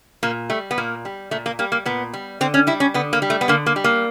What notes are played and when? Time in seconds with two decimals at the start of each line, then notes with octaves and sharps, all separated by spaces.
0.23 A#2 A#3
0.50 G3 A3
0.71 B3
0.78 A#2 A#3
1.05 G3
1.31 A#2 A3
1.46 A#3
1.59 G3 A#3
1.72 A#3
1.85 A#2 B3
2.14 G3
2.41 D3 C4
2.54 C#4
2.67 G3 E4
2.80 C#4
2.94 D3 B3
3.13 A#3
3.22 G3
3.30 A3
3.41 B3
3.48 D3 A#3
3.66 A#3
3.76 G3
3.84 A#3